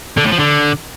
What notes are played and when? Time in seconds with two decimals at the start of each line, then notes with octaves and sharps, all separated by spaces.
0.17 D3
0.24 A2
0.32 F3
0.39 D3